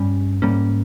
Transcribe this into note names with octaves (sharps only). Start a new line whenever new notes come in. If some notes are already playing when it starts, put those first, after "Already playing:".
Already playing: G2 G3 C#4
G#2 G3 A#3 C#4